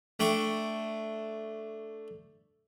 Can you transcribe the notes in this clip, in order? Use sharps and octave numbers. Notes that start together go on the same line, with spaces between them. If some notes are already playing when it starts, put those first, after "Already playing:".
A3 D4 G5 C#6